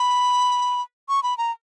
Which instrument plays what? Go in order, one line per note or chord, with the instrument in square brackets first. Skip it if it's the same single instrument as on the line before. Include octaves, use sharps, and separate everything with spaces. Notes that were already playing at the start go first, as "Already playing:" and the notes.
Already playing: [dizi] B5
C#6
B5
A#5